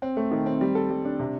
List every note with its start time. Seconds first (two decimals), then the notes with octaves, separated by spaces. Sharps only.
0.02 C4
0.17 A3
0.31 D#3
0.46 C4
0.61 G3
0.75 A4
0.90 G3
1.05 D4
1.19 C3